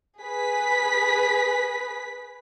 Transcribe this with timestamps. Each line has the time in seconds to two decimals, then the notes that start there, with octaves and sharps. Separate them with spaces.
0.22 G#4 B4 B6